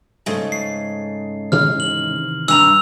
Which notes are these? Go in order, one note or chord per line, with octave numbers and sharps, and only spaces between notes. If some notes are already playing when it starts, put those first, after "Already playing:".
G#2 C#3 A3
C7
C3 D#3 E3 F6
F#7
G2 G#5 A#5 E6 F7